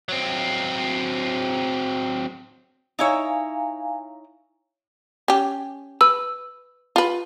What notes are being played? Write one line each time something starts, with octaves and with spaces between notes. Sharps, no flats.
F#3 C4
D#4 E4 C#5 F5 G#5 A#5
C#4 G4
B4 E6
F4 B4